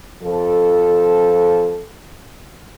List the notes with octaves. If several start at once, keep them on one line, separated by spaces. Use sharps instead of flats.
F2 F3 A4